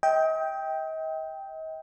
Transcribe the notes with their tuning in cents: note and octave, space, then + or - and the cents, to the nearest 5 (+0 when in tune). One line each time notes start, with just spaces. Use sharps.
D#5 +40 G5 +0